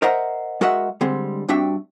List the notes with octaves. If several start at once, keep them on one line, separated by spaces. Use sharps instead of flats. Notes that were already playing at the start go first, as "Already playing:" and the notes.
A#4 C5 D#5 E5 F#5 A#5
G#3 F#4 A#4 D#5 E5 F#5
D3 G3 G#3 C4
G2 C4 D4 F#4 E5 G5